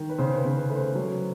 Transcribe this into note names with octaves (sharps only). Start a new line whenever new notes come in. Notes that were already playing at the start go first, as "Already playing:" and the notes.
Already playing: D#3
B4
C#3 C5
C5
B4
C#3
B4
A3 B4
C5
F#3